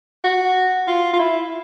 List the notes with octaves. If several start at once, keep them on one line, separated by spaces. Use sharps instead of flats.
F#4
F4
F4
E4